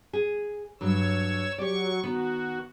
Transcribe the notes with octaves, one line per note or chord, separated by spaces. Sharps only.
G#4
G2 F#3 C#5 E6
F#3 G4 C#5 D5 C#6
D#3 B3 F#4